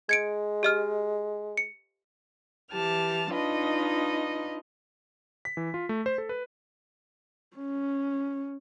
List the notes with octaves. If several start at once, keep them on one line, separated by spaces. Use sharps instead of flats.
G#3 G#6 C#7 D7
G4 D#5 F6
C#7
E3 G4 A5 F6
D4 D#4 F4 B4 D#5
B6
E3
F4
A3
C5
A4
B4
C#4